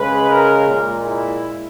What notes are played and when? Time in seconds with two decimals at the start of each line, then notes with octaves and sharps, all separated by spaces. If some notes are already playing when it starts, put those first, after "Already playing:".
Already playing: C#3 G#3 B4
0.29 A#4
0.67 A#2
0.72 G#3
1.06 E4